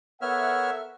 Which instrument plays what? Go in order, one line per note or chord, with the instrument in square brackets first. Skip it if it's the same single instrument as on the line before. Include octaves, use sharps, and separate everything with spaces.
[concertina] B3 C#5 F6 [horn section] A4 A#4 E5 [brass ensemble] F#5